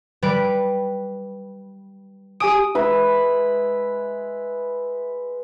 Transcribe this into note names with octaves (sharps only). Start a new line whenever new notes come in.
G3 B4 D7
G4 G#5 D#6 D7
G#3 B4 E5